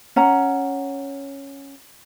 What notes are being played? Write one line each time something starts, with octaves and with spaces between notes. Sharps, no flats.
C#4 F#5 A#5